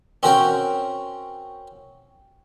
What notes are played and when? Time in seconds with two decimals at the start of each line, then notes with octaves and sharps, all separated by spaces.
0.23 C4 C#4 F#4 A#4 G5